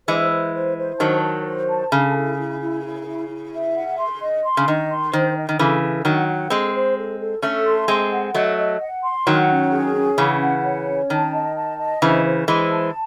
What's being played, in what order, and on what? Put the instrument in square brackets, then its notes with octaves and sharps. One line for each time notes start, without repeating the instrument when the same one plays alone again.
[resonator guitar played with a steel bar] E3 G#3 [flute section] C5
[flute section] C5
C5
C5
[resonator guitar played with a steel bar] D#3 F#3 [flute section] A5
[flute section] C5
C5
A5
[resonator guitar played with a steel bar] C#3 [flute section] A4
[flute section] E4
E4
E4
E4
E4
E4
E5
F#5
C6
D#5
C6
[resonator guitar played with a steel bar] C#3
[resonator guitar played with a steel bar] D#3 [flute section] D#5
[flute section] C6
[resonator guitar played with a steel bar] D#3 [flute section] C5
[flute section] D#5
[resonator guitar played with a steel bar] D#3
[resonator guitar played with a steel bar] C#3 E3 [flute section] A4
[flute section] A4
[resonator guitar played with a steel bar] D#3 F#3 [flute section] F#5
[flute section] F#5
[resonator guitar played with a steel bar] G#3 C4 [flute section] A4
[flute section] C5
A4
A4
[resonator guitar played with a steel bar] A3 C#4 [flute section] A4
[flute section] C6
[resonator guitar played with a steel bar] G#3 C4 [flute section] D#5
[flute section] F#5
[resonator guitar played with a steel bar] F#3 A3 [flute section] D#5
[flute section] D#5
F#5
C6
[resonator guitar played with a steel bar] D#3 F#3 [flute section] F#5
[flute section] C#4
G#4
C#4
[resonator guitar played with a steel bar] C#3 E3 [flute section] F#5
[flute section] F#5
C#5
C#4
[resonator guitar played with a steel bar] D#3 [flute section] A5
[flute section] D#5
A5
D#5
[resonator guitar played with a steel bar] C#3 E3 [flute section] C5
[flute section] C5
[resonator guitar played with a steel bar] E3 G#3 [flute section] C5
[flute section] A5